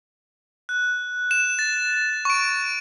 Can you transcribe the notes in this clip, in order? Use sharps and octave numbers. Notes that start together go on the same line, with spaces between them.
F#6
E7
A6
C#6 D7